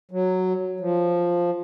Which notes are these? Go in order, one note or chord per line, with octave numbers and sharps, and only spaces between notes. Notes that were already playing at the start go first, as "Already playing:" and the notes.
F#3
F3